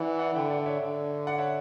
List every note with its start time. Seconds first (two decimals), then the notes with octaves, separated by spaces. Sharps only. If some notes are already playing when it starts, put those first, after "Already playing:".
Already playing: E3 D5 F#5
0.19 D5 F#5
0.35 D3 E5 G5
0.50 D5 F#5
0.66 C#5 E5
0.82 D3
1.27 D5 F#5
1.38 C#5 E5